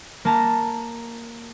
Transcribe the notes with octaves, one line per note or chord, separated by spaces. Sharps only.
A#3 A5 A#5